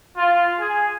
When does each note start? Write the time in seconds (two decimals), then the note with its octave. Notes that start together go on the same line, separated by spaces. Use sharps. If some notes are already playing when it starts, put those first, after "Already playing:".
0.17 F4
0.58 G#4